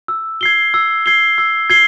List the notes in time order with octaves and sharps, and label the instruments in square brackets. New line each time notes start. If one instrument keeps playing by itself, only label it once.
[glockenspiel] E6
G#6 C7 G7
E6
G#6 C7 G7
E6
G#6 C7 G7